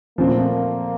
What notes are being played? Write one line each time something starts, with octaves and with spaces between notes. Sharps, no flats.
A#2 F3 A3 A#3 C4